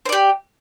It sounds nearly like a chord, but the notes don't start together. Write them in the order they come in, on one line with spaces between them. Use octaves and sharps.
C5 D5 G4